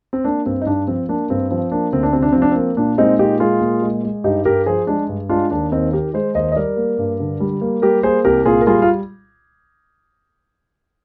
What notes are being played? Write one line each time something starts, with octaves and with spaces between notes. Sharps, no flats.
C4
A#3 D4
G2 C4
D#4
G2 D4
F3 C4
A#3 D4
G2 C4
F3 C4
A#3 D4
D2 C4
D4
C3 C4
D4
F3 C4
D4
A#3 C4
A#2 D4
G#3 C4 D#4
A#2 D#4 G4
G#3 F4 G#4
A#2
G#3
G#3
G2 D#4 G4
G2 G4 A#4
F3 G#4 C5
G#3 D4
G2
G#3 D4 F4
D#2 D4
D#2 C4 D#4
D#3 G4 A#4
G#3 G#4 C5
D#2 C5 D#5
D#5
G3 A#4 D5
A#3
G2
D3
G3
A#3
G3 G4 A#4
A#3 G#4 C5
C2 G4 A#4
A#2 F4 G#4
A#4
G3 F4 G#4
F4